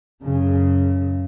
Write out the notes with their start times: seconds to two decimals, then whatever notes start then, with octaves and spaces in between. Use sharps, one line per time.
0.23 F#2 C#3